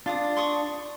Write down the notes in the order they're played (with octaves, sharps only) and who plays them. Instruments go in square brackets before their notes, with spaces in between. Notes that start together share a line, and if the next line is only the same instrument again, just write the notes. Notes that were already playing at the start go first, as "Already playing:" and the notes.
[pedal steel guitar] D4 [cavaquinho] F4 D6 D#6
[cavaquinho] C6 C#6 D#6